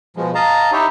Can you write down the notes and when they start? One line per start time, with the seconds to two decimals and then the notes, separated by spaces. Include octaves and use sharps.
0.17 B2 F3 G#3
0.35 D#5 F5 A5 A#5
0.72 D#4 E4 G4 C#5 D#5 E5